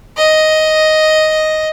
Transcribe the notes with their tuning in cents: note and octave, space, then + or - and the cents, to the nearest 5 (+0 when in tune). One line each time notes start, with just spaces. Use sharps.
D#5 +5